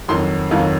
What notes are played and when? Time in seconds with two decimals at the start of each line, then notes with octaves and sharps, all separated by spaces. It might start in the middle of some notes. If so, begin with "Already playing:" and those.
0.08 F2 D#3 F#3 C6
0.51 F2 D#3 F#3 F5